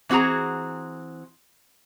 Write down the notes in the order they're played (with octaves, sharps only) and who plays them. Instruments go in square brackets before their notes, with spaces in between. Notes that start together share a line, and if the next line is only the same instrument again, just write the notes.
[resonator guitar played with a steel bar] E3 C4 F#4 G#4 A#5